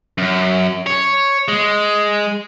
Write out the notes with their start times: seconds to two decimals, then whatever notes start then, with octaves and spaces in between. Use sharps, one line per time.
0.18 F#2
0.87 C#5
1.48 G#3